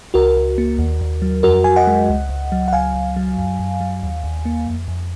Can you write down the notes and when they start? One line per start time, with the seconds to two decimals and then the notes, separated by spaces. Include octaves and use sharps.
0.14 C#2 F#4 A#4
0.37 C#2
0.58 A#3
0.79 D#2
1.01 D#2
1.22 F#3
1.43 F2 F#4 A#4
1.64 F2 G#5
1.76 D#5 F#5
1.87 G#3
2.09 C#2
2.29 C#2
2.52 F#3
2.68 F#5
2.73 C#2 F5 G#5
2.95 C#2
3.17 F#3
3.37 F#2
3.59 F#2
3.81 F#3
4.03 D#2
4.24 D#2
4.45 A#3
4.67 F2
4.88 F2